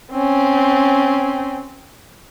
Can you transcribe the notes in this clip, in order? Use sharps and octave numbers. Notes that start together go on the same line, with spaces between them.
C4 C#4